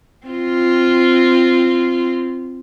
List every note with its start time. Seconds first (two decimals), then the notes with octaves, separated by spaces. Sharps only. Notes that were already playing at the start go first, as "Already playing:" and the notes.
0.27 C4 F4